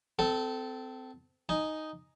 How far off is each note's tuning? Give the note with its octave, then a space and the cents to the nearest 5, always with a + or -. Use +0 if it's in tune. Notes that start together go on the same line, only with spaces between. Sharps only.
C4 -25 A4 +0
D#4 +0 G#5 +10